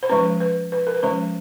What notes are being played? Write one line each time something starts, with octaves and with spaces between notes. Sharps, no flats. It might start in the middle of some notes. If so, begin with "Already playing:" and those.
C5
F3 G#3 C#4 B4
B4
B4
A#4
B4
F3 G#3 C#4 C5